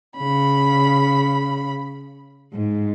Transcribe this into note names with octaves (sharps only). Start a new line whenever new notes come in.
C#3 B5
G#2